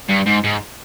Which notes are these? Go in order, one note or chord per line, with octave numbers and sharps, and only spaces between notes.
G2
G#2
G#2